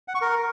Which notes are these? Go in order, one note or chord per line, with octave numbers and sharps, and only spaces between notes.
F#5
C#6
A#4